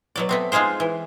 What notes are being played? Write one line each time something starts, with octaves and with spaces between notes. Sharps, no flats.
B2 F#3 D5
A3 B3 C4
G#3 D#4 F4 G#4 C5
E3